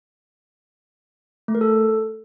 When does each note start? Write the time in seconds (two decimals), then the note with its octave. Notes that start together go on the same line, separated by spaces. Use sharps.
1.48 A3
1.55 A#4
1.61 A4